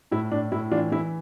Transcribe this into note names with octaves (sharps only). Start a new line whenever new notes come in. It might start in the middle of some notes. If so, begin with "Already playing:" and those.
A2 E4
A2 D4
A2 E4
E3 D4 F4
E3 E4